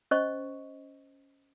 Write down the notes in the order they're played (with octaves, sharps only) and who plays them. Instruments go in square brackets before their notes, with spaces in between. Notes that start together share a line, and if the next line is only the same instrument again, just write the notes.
[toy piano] C#4 C5 D#5 C#6